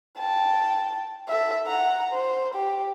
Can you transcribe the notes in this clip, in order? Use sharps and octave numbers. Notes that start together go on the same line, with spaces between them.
G5 A5
A4 E5
F#5 A#5
C5
G4